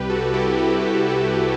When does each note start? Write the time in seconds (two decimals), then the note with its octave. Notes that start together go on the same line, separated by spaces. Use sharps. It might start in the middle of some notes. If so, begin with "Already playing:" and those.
Already playing: C2 C3 G3 G4 B4
0.10 F#4 A4
0.34 E4 G4
0.58 F#4
0.83 E4
1.07 F#4